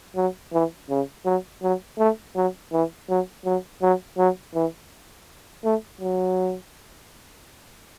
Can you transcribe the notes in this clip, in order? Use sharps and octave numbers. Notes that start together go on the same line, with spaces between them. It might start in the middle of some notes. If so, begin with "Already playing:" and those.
F#3
E3
C#3
F#3
F#3
A3
F#3
E3
F#3
F#3
F#3
F#3
E3
A3
F#3